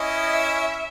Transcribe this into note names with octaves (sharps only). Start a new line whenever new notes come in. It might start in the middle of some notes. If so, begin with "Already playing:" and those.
Already playing: C#4 E4 D#5
E5